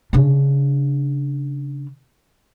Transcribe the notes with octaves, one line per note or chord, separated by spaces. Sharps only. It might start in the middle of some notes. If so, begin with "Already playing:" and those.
C#3 D4